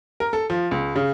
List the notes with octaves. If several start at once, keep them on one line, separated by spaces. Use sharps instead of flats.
A#4
A4
F3
C#2
C#3